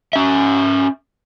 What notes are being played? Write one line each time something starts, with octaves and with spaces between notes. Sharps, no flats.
C#4 E5